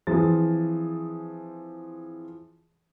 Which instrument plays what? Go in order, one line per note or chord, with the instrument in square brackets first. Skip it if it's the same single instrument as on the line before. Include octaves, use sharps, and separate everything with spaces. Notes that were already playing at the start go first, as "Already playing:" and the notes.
[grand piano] E3 F3 C4 G#4 A6